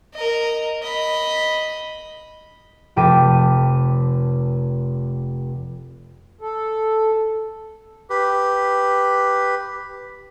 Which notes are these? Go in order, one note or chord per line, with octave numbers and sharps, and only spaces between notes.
A#4 D#5
D#5 B5
F1 G5 A5 D6 B6 D#7
A4
G4 B4